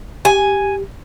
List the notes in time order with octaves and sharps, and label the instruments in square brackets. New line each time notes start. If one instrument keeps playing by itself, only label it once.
[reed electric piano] G4 [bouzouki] G#5